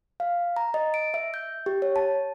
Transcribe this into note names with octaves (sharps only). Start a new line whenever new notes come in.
F5
A#5
D#5
D7
E5
G6
G4
C#5
A5